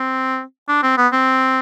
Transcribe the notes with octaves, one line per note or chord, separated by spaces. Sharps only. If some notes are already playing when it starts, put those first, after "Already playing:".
Already playing: C4
D4
C4
B3
C4